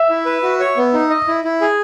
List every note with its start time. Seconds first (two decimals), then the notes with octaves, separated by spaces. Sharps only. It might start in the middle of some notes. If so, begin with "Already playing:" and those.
Already playing: E5
0.09 E4
0.26 B4
0.43 F#4
0.60 C#5
0.77 B3
0.93 D#4
1.10 D#5
1.28 E4
1.45 E4
1.61 G#4